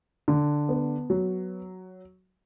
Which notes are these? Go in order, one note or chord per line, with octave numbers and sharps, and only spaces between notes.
D3
B3
F#3